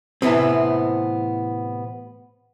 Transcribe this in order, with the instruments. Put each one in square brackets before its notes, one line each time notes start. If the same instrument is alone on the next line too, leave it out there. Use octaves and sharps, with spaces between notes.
[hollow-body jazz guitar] A2 C3 E3 B3 C4